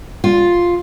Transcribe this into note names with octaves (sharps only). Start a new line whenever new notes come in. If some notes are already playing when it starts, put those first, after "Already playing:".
F4